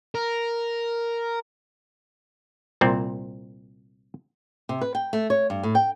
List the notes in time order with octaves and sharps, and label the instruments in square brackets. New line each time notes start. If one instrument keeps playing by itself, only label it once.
[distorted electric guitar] A#4
[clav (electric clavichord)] C2 A#2 C4
[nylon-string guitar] C3
B4
G5
A3
C#5
G2
A2
G5